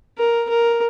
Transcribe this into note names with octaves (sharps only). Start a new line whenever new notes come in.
A#4
A#4